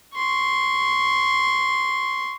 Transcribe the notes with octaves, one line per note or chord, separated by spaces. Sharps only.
C6 C#6